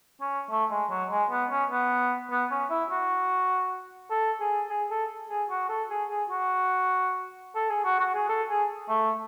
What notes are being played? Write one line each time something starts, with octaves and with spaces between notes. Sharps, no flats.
C#4
A3
G#3
F#3
G#3
B3
C#4
B3
B3
C#4
E4
F#4
A4
G#4
G#4
A4
G#4
F#4
A4
G#4
G#4
F#4
A4
G#4
F#4
F#4
G#4
A4
G#4
A3